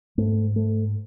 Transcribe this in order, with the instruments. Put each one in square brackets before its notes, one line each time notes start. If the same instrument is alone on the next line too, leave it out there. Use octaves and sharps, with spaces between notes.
[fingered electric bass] G#2 A3
A3